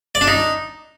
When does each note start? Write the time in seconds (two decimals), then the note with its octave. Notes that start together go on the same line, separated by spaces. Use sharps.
0.15 D5
0.21 D4
0.28 D#4